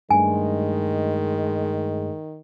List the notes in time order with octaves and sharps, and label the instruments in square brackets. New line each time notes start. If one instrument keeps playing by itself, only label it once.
[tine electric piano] G2 A3 [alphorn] D#3 [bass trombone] G#3 [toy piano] G#5